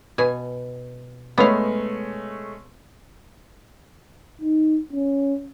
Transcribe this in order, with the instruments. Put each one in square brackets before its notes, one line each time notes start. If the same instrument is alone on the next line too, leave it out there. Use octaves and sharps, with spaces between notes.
[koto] B2 G#5
[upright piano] G#3 A3 C#4 [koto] B3 F5
[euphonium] D#4
C#4